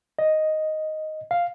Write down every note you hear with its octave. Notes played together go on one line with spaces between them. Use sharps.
D#5
F5